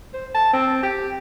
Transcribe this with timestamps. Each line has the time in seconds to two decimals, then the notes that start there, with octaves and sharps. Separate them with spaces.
0.14 C5
0.35 A5
0.53 C4
0.83 G4